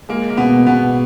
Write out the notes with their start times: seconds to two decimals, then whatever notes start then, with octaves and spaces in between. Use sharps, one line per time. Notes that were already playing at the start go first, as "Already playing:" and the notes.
0.09 G#3 A#3
0.30 A#3
0.37 B2 B3
0.67 B2 B3